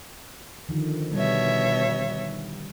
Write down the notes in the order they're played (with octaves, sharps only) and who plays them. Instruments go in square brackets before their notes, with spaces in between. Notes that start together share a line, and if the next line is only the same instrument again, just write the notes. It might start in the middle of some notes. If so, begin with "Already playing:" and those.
[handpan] D3 D#3 F3
[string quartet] B2 C#5 E5 [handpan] G3